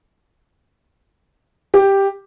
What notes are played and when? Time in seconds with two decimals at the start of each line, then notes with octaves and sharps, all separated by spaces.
1.74 G4